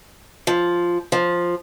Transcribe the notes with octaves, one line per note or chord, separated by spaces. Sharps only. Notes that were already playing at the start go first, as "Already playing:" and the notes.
F3
F3